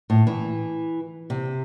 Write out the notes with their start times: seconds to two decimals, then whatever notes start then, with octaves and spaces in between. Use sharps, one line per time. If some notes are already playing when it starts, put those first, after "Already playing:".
0.10 A2
0.27 E3
1.30 C3